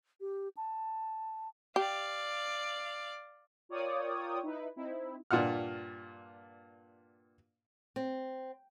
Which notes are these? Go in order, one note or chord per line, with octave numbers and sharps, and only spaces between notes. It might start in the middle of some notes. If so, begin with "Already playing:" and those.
G4
A5
G4 D5 F5
F4 A#4 C#5 D5 G5 D#6
D#4 E4 B4
C4 D#4 E4
G2 A#2 F4 F#5 F6
C4